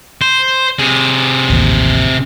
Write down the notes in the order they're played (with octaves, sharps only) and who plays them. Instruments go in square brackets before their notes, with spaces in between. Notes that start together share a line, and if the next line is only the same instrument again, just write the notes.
[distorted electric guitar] C5
C3 G#4
[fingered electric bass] A1 D#2